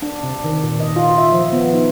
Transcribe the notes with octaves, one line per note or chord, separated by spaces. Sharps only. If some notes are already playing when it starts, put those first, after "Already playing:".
D4
C3
D#3
A#2
D#5
F4
E5
F3
B3
D#4